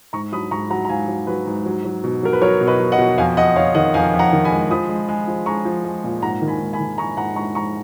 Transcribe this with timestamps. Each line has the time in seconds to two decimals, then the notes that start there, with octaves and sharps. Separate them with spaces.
0.13 G#2 A#5 C#6
0.32 F#3 B5 D#6
0.51 G#2 A#5 C#6
0.70 F#3 F#5 A#5
0.85 A#5
0.89 G#2 F5 G#5
1.08 F#3
1.27 F#3 B4
1.47 G#2
1.66 F#3
1.85 F#3
2.04 B2
2.23 F#3 A#4
2.33 B4
2.41 F#3 A#4 C#5
2.61 B2
2.67 B4 D#5
2.79 F#3
2.92 D#5 F#5
2.98 B2
3.18 F2 F5 G#5
3.37 F2 D#5 F#5
3.56 F2 C#5 F5
3.75 D#3 D#5 F#5
3.94 F2 F5 G#5
4.14 F2
4.19 F#5 A#5
4.33 D#3
4.44 G#5 B5
4.51 G#3
4.70 F3 B5 D#6
4.89 G#3
5.09 G#3
5.28 F3
5.46 G#3 A#5 C#6
5.65 F3
5.85 G#3
6.04 A#2
6.22 G#2 F#5 A#5
6.42 D#3
6.48 G#5 B5
6.60 G#2
6.73 G#5 B5
6.80 D#3
6.98 G#3 A#5 C#6
7.17 G#2 F#5 A#5
7.36 G#3 A#5 C#6
7.55 G#2 A#5 C#6